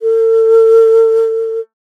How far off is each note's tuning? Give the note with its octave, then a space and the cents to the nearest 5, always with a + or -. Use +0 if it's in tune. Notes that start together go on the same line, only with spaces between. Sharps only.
A4 +40